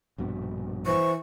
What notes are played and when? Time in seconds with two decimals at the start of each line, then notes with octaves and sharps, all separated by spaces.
0.18 A#1 G2 B2
0.86 E3 C5 C#6